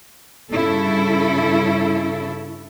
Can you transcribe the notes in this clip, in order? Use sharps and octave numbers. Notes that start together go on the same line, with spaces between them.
G2 C#3 E4 A4